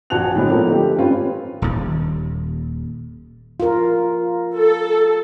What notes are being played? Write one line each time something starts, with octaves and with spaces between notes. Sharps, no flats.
A#1 F#4 G#5 A5 F#6 F7
A2 D3 G#3 B3 C4
D3 F3 A3 A#3 C4
A3 D#4 G4
G#1 C4 C#4 F4 B4
D#1 D#2
F4 A#4
A4